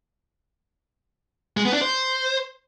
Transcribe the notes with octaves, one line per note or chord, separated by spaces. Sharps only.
G#3
B3
D4
C5